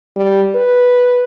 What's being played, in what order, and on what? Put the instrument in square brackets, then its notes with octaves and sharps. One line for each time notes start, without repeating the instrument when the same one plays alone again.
[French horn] G3
B4